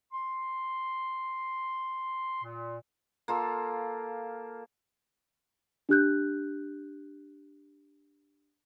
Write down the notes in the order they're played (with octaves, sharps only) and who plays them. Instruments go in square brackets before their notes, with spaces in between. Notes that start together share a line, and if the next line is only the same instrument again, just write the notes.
[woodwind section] C6
A#2
[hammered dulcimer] A#3 F4 A4
[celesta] D4 G4 F#6 G6